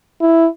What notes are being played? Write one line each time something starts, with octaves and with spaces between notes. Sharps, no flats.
E4